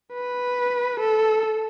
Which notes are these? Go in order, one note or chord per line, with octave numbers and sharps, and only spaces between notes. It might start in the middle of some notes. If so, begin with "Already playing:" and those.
B4
A4